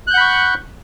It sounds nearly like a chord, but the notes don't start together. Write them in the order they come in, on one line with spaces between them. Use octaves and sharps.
F#6 G6 F#5 B5 C#6